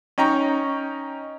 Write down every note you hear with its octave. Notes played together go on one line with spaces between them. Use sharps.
C#4 D#4 G5 A#5 C#6